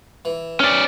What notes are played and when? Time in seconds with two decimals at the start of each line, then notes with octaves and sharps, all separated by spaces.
0.25 E3
0.60 C#4 D5